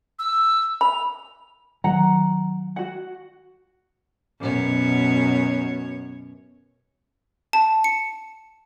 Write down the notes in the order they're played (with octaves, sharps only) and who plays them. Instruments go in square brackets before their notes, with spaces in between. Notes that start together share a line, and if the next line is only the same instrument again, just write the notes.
[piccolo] E6
[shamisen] B5 [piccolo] F7
[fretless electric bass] D#3 F#3 [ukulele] F#5 A#5
[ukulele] F#4 F#5
[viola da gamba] F#2 B2 C#5
[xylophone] A5
C#7